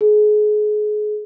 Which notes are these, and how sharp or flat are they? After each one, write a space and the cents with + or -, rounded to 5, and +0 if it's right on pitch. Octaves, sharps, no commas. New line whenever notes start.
G#4 +30